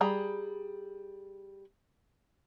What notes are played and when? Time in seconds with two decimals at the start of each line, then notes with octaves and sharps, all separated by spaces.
0.01 G3 G#4 A#5 B5